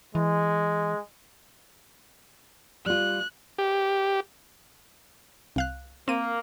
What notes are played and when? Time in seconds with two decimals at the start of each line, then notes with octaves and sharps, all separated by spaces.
0.15 E3 G#3
2.86 G3 F4 F#6
3.59 G4
5.56 C2 F5 F#6
6.08 A#3 C4 D#7